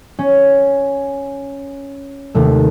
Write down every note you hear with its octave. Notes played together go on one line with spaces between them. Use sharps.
C#4
D#2 C3 A3